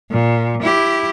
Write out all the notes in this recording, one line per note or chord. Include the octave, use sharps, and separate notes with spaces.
A#2
E4 G4